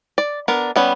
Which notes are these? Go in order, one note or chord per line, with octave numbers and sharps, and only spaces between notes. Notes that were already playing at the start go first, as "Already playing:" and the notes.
D5
B3 D4 A#4
G3 B3 C#4